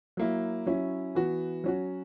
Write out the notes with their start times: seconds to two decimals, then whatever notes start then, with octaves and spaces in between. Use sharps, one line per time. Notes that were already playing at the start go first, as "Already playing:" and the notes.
0.17 F#3 A#3 E4
0.66 F#3 C#4 E4
1.15 E3 B3 F#4
1.64 F#3 C#4 F#4